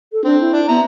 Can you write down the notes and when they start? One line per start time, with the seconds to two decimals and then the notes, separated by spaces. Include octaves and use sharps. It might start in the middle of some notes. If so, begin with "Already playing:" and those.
0.13 A4
0.25 C4 D4
0.41 E4
0.53 D4
0.69 B3 E5 A#5